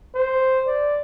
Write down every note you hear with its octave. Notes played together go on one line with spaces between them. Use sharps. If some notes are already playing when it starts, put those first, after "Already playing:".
C5
D5